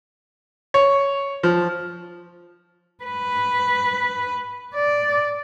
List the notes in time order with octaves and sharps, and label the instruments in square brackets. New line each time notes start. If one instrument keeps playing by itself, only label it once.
[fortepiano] C#5
F3
[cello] B4
D5